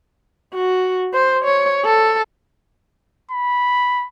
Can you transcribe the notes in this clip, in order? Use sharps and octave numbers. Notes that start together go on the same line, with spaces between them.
F#4
C5
C#5
A4
B5